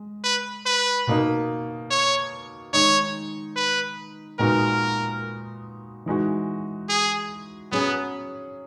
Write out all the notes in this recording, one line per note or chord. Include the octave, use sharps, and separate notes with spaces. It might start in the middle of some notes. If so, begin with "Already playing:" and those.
Already playing: G#3
B4
B4
B2 A#3 D#4
C#5
D#3 G#3 D#4 C#5
B4
A#2 G#3 B3 D#4 F#4 A#4
E3 G#3 D#4 F#4
G#4
F#3 B3 C#4 G#4